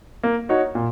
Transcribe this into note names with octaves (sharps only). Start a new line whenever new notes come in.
A#3
D#4 F#4 C#5
A#2